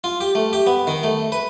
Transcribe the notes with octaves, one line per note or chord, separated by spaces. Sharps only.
F4
G4
A3
G4
B3
D#3
A3
B4